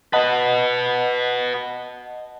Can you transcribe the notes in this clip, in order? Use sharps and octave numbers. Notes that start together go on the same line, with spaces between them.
F#4 B4 D#5 F#5 A5